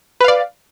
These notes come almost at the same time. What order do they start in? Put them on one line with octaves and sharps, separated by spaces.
B4 F5 D5